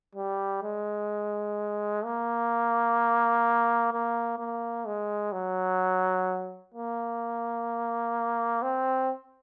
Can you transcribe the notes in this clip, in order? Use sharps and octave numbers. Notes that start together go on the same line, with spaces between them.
G3
G#3
A#3
A#3
A#3
G#3
F#3
A#3
C4